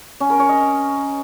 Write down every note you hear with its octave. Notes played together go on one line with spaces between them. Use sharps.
C#4
A#4
C#5
D#5